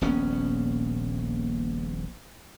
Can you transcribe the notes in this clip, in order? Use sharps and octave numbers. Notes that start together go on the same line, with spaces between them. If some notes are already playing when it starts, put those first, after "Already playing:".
D#1 A#1 B3 C#4